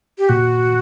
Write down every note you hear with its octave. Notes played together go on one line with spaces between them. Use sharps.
G4
A#2 F#4